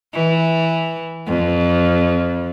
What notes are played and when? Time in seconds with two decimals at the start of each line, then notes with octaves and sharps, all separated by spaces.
0.13 E3
1.27 F2